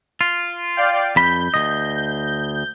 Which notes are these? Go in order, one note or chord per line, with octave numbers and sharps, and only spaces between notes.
F4
D5 F5 G5
F2 B5 G6
D2 D#5